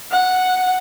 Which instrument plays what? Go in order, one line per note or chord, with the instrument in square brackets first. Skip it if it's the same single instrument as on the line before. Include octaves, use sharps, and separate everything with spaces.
[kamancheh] F#5